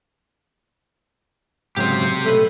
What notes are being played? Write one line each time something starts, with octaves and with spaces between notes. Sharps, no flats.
G#2 C#3 F#3 G4 C5
B1 A3 A4 B4